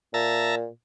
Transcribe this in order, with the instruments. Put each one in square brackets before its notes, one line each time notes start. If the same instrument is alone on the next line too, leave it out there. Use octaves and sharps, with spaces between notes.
[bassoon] A#2 [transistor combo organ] E5 A5 A#5